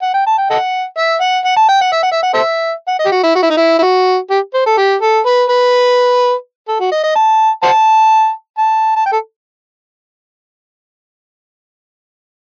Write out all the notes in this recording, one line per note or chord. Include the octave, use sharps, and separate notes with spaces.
F#5
G5
A5
G5
A4 D#5 F#5
E5
F#5
F#5
A5
G5
F#5
E5
F#5
E5
F#5
A4 C5 E5
F#5
D#5
G4
F#4
E4
F#4
E4
D#4
E4
E4
F#4
G4
C5
A4
G4
A4
B4
B4
A4
F#4
D#5
D#5
A5
C5 F#5 A5
A5
A5
G5
A4